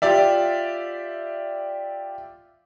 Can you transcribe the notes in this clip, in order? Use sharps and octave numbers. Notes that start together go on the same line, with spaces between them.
F4 G4 D5 E5